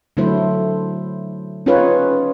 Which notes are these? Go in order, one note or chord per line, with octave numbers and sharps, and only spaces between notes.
D3 F#3 A3 E4 C5
C#4 D#4 F4 G#4 B4 C#5